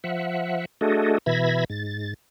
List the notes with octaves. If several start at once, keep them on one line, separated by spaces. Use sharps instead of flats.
F3 E5 F#5
A3 D4 F#4 G#4 A4 D#5
B2 E3 E5 B5 G#6 A#6
G#2 A6